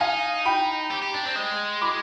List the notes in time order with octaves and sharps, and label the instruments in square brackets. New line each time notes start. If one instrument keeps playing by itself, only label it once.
[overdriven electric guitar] D#4 [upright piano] F5 G#5
[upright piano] G5 B5
[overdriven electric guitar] G4
G4
D4
C4
G#3
[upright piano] B5 D6